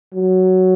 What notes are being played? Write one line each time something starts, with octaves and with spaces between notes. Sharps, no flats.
F#3